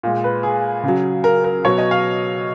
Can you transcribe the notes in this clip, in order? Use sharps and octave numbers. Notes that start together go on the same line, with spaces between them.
A#2 G#3
B4
G#4
C#3 F#3
A#4
A#4
B2 F#3 C#5
D#5
F5